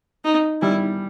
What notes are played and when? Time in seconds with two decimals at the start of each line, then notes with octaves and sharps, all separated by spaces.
0.24 D#4
0.62 G3 E4